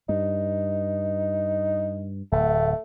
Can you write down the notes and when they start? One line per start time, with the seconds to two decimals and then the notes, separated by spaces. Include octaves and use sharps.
0.09 G2 D#4
2.32 D1 A3